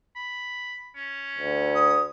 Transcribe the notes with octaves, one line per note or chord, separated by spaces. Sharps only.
B5
C#4
D2
D#6